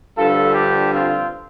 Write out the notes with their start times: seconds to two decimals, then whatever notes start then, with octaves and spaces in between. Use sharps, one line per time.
0.17 G2 D3 F3 F4 A4
0.54 D4 G4
0.93 C4 F4